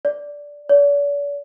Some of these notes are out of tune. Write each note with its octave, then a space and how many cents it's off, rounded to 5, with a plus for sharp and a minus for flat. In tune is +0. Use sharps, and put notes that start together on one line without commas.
D5 -10
D5 -45